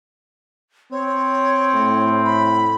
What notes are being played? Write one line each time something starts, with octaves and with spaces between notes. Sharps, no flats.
C4 C#5
A2
B5